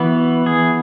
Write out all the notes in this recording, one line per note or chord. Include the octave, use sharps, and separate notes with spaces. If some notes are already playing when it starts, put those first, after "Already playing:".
Already playing: E3 B3 F#4
G#4